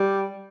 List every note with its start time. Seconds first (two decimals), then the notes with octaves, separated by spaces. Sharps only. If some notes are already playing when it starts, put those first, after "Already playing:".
Already playing: G3